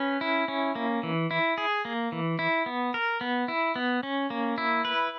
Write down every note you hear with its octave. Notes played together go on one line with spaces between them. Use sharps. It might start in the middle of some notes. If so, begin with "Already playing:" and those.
Already playing: C#4 B4
E4
C#4
A#3
E3
E4
G#4
A#3
E3
E4
B3
A#4
B3
E4
B3
C#4
A#3
E4
B4